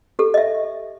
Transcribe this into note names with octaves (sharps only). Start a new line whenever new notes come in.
G4 A4
D#5 E5